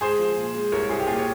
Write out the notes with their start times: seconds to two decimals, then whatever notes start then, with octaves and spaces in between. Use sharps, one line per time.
0.01 G#3 G#4 C5
0.19 F3
0.36 A#2
0.54 G#3
0.72 C2 A#4 C#5
0.89 C2 G#4 C5
1.00 G4
1.07 A#2 F4 G#4
1.19 C#5